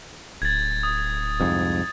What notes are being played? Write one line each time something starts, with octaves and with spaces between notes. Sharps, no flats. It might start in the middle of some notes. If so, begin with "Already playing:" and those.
D1 G#6 A6
D#6
C2 F2 G#2